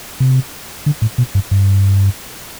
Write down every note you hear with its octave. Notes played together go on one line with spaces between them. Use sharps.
C3
D3
A2
B2
G2
G2